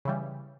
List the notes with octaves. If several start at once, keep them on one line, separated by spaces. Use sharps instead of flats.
C#3 E3 G3